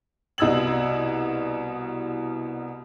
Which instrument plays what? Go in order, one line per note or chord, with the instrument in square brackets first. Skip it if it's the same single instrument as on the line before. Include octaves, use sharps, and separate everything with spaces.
[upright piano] C2 B2 D#5 E6 G#6 F#7